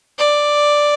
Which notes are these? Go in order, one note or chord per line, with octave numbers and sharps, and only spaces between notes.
D5